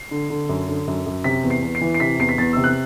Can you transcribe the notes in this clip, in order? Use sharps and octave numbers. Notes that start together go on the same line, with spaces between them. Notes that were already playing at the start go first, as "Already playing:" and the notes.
Already playing: C7
D3
D3
F#2
D3
F#2
F#2
C3 B6
E2
C7
E2
C7
E3
C7
C3 B6
E2 C7
B6
E2 A6
C3 E6
F#6